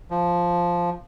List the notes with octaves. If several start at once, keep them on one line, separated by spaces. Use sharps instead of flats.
F3